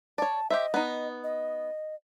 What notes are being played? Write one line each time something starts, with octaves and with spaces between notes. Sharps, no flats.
C#5 D5 A5
G4 C5 D#5 E5
B3 D#4
D#5